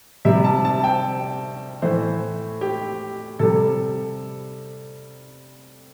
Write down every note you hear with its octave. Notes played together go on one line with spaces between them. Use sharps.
C3 G3 E5
A5
A5
G5
A2 E3 A3 C5
G4
C3 G3 A4